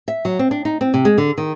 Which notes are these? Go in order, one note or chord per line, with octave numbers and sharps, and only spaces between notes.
E5
F#3
C4
D4
D#4
C4
C3
G#3
D3
D#3